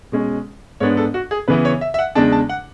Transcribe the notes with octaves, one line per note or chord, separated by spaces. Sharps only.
B2 G#3 C#4
G#2 G#3 B3 D4 C#5
A4
F#4
G#4
C#3 E3 B3 B4
C#5
E5
E5
F#5
E2 C#3 G#3 D4 A5
A5
F#5